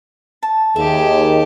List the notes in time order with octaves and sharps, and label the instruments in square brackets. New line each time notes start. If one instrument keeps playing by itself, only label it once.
[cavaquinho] A5
[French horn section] D#2 [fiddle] G4 A5 [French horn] G#4 [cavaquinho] E5